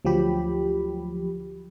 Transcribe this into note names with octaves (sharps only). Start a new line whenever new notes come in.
D2 F3 F#3 G4 B5